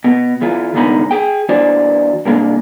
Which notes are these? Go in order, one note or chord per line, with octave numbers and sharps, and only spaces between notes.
B2
E2 E3 F4
C2 G#2 D3 B3 D#4 B5
G#4 G5
E3 D4 F#4 C5 D5
C2 G#2 A#3 D4